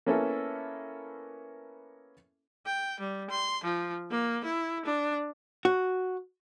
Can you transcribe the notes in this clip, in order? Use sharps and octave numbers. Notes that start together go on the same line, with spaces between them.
A#3 B3 C#4 E4 A4
G5
G3
C6
F3
A#3
E4
D4
F#4